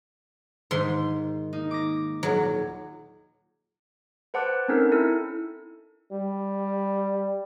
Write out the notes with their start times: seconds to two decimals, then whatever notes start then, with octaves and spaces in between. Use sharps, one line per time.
0.71 G#2 D#3 C6
1.53 A#3 D#4
1.71 D6 A#6
2.23 D#1 F#3
4.34 B4 C5 F#5 A5 D6 F#6
4.68 C4 C#4 D#4 A4 A#4
4.92 E4 A4
6.12 G3